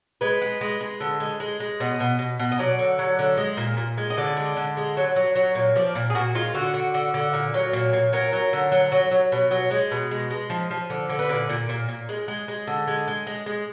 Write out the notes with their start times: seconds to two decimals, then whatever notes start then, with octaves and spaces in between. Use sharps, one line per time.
0.21 G#3 B4
0.42 G#3
0.61 G#3
0.81 G#3
1.00 D3
1.20 G#3
1.40 G#3
1.60 G#3
1.80 B2 D#5
2.00 B2
2.19 B2
2.39 B2
2.52 D#5
2.59 F#3 D5
2.79 D3
2.99 F#3
3.19 D3
3.37 G#3
3.57 A#2
3.77 A#2
3.98 G#3
4.10 D#5
4.17 D3 D5
4.37 G#3
4.56 D3
4.77 G#3
4.97 F#3
5.16 F#3
5.36 F#3
5.55 A#2
5.76 F3 D5
5.95 A#2
6.10 G#4
6.15 A#2 F#4
6.35 G#3 F4
6.55 D3 F#4
6.74 D3
6.94 D3
7.14 D3
7.33 A#2
7.54 F#3
7.73 A#2
7.93 A#2
8.13 F#3 A#4
8.33 F#3
8.53 D3
8.72 F#3
8.92 F#3
9.11 F#3
9.32 B2
9.51 F#3
9.71 G#3
9.91 B2
10.11 G#3
10.30 G#3
10.50 F3
10.71 F3
10.90 D3
11.09 D3
11.19 B4
11.29 A#2 D5
11.50 A#2
11.69 A#2
11.89 A#2
12.09 G#3
12.28 G#3
12.48 G#3
12.67 D3
12.87 G#3
13.08 G#3
13.27 G#3
13.46 G#3